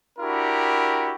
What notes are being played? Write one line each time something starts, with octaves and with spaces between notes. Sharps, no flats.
D4 E4 F#4 G4 A#4